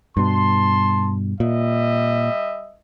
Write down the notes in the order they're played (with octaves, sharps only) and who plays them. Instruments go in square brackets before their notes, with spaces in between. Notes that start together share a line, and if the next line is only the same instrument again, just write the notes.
[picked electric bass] G2 B2 [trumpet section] A5 C6
[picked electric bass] A#2 [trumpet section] G3 D#5 E5